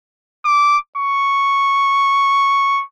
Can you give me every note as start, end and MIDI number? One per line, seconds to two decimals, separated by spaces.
0.45 0.77 86
0.98 2.83 85